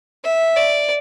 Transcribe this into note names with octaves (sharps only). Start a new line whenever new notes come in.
E5
D5